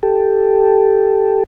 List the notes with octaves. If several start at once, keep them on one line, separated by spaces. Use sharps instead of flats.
G4 A4